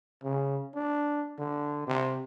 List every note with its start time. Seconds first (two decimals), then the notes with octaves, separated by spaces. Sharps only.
0.24 C#3
0.75 D4
1.39 D3
1.87 C3